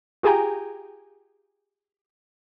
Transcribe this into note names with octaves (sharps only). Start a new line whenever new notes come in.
F4 G4 G#4 G5 G#5 A#5